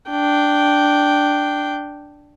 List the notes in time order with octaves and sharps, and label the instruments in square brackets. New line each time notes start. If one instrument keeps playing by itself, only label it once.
[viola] D4 G5